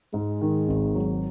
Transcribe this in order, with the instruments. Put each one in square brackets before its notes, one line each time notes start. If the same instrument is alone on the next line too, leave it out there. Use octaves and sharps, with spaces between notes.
[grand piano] G#2 [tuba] G#3
[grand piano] D#3
G#1
F#3